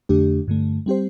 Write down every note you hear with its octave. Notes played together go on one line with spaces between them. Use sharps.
F2 D3 A3 D4 G4
G2 D3 A3
G3 C4 G4 C5